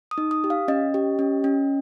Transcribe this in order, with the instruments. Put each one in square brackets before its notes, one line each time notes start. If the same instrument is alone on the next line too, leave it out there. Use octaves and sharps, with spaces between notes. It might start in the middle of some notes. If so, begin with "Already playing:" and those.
[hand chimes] D#6
D#4
D#6
G4
F5
C#4 D#5
G4
C#4
C#4